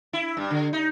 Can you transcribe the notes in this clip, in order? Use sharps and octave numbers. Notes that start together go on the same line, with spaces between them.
E4
G2
D3
D#4